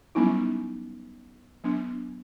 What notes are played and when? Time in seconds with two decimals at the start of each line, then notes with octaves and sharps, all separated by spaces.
0.15 F#3 G3 B3 C#4 D#4 E4
1.64 F#3 B3 D4